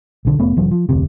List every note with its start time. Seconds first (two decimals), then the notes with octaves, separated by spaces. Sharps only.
0.25 B1 D3
0.39 F1 A3 B3
0.57 F1 E3 F#3
0.71 F3
0.89 F1 D2 C3